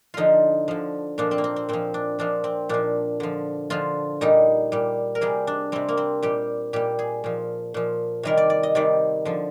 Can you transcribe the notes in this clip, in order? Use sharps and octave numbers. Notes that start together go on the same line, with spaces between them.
D3 F3 D#4 F4
D3 F3
A#2 F3 D4
C4
A#3
C4
C4
A#2 F3 C4
D4
A#2 F3 D4
C4
A#2 F3 D4
D3 F3
D3 F3 F4
A#2 G3 D#4
A#2 G3
A#4
C3 G3 G#4
D4
C3 G3 C4
A#3
C4
A#2 G3 G4
A#2 G3 G4
G#4
A#2 F3
A#2 F3
C3 D#3 G3 A#4
D5
D5
D#5
C3 D#3 G3 D5
D3 F3